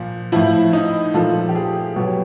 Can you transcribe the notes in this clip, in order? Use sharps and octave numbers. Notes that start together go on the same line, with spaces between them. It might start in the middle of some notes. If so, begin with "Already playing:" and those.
Already playing: A#2 F3
A2 F3 E4
D#4
A#2 F3 A4
G4
G#4
B2 F#3 G4